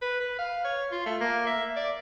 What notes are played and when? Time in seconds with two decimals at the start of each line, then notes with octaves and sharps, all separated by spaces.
0.02 B4
0.21 B4
0.39 F5
0.64 C#5
0.91 F4
1.06 A3
1.20 A#3
1.47 E5
1.77 D5